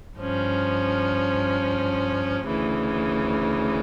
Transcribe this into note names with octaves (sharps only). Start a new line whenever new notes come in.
G2 F3 C#4
D2 C#3 E3